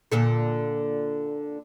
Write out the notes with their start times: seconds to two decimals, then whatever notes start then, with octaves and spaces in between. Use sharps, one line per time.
0.12 A#2 D3 A4